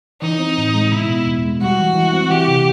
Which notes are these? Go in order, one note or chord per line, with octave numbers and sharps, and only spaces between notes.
E3 D#4
C4
A2
G#3
B2 E4
B3
E2
G#3
G3 F#4
E3
E3
C4
E3 G4
C3